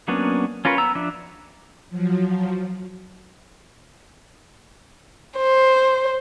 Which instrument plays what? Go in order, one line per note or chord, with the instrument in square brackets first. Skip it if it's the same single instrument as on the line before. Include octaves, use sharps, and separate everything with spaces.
[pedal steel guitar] F#3 A#3 B3 C#4 D4
C#4 F4 A#4 B4 C#5
B3 A#5 E6
F3 D4 E5
[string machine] F3 F#3
[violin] C5